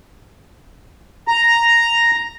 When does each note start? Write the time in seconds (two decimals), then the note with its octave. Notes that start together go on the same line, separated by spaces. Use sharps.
1.28 A#5